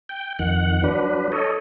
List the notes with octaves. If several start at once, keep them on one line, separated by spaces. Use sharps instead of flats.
G5
F2 D#3 F#5
F#3 D4 B4
A4 C#5 D#5